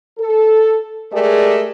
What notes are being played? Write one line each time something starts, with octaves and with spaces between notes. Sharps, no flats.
A4
G#3 A3 G4 G#4 A#4 D5